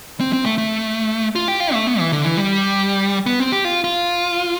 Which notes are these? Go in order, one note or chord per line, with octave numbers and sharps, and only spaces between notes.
C4
C4
A3
A3
F4
G4
F4
A3
B3
E3
D3
E3
G3
B3
C4
G4
F4
F4